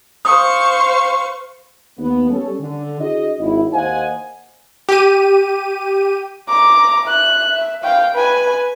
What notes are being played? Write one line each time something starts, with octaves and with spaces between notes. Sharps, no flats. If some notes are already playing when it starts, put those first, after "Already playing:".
C5 F5 C#6 D#6
D#2 B3
G3 C#4 A4
D3
D4 E4 F#4 G#4 D#5
G#1 E4
D#2 C5 D#5 F5 F#5 G#5
G4 D#7
A#5 D6
E5 F#6
E5
F5 G5
B4 G#5